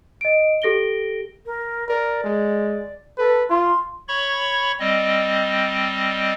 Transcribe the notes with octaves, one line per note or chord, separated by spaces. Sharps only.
D#5 D7
G4 A4 A#6 D7 G7
A#4
A#4 D5
G#3
A4 B4
F4 C6
C#5 B5 C#6
G3 C4 D#5